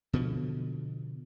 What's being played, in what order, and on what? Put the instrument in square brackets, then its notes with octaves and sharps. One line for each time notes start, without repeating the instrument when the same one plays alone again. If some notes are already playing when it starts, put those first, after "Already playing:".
[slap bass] B2 D3 F3